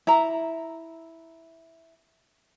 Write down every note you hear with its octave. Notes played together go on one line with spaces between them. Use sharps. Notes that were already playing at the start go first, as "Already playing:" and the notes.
E4 E5 A#5